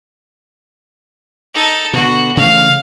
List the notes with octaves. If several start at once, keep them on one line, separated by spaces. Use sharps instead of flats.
D#4 A4
B2 D3 F#4
C#3 E3 A3 F5